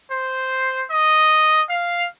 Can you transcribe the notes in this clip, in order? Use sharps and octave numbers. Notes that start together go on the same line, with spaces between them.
C5
D#5
F5